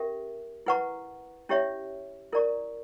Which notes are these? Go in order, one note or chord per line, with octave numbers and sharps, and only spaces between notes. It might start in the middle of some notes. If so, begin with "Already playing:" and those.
Already playing: C#4 G4 A#4 E5
E4 B4 F#5 A#5 C#6
C#4 E4 G4 C#5 E5
E4 A#4 D5 A#5 C#6